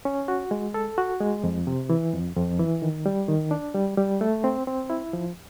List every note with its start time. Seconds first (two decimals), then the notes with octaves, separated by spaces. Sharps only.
0.05 C#4
0.28 F#4
0.51 G#3
0.74 A4
0.98 F#4
1.20 G#3
1.44 F2
1.67 C3
1.90 E3
2.13 F2
2.36 F2
2.59 E3
2.82 D#3
3.06 G3
3.29 D#3
3.51 D4
3.75 G3
3.98 G3
4.21 A3
4.44 C4
4.67 C4
4.90 E4
5.13 F3